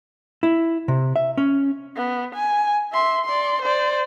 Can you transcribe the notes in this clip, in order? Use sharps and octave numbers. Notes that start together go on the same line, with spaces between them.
E4
C3
E5
C#4
B3
G#5
E5 C6
D5 C6
C5 D5